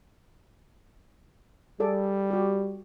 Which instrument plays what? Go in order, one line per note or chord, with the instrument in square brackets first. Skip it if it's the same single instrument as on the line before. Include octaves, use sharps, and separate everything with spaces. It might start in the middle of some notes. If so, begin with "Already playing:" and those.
[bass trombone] G3 [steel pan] G#4 A4 D5
[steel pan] F#4 G4